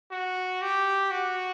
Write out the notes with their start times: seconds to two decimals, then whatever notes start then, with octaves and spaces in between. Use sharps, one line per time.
0.11 F#4
0.62 G4
1.11 F#4